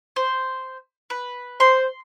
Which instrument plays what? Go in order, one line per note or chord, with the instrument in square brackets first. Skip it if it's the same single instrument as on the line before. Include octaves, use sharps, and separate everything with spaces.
[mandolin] C5
B4
[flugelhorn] C5 [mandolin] C6